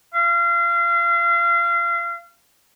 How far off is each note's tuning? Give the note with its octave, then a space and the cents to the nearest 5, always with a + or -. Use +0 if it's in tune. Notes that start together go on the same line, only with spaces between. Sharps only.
F5 -30